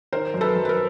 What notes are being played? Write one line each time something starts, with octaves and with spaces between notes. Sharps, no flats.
D#3 A#4 C5
F#2
A4 B4
F#2
B4
A#4